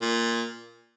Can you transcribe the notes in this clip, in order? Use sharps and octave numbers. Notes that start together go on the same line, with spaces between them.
A#2